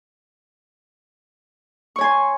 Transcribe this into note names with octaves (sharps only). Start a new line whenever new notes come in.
C#5 G#5 C6 C#6